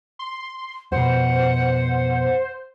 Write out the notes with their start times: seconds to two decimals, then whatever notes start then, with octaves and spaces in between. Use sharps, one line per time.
0.19 C6
0.92 F2 B2 C5 F#5